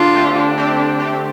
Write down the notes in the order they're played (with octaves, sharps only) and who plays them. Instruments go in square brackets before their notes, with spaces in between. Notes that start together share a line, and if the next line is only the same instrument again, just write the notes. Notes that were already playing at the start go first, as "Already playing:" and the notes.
Already playing: [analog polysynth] D3 [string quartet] D4 F4
[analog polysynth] A3 C4 G4
[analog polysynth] D3 [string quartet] D4
[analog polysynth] A3 C4 G4
D3
A3 C4 G4